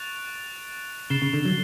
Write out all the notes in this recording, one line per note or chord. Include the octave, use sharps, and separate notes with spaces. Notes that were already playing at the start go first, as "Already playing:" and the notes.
Already playing: C#6 F#6 A6 D7 F7
C#3 A6 C7 E7 G7
C#3
D3
F#3